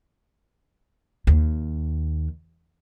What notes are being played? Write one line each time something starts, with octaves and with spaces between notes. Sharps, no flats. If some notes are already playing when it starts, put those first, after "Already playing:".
D#2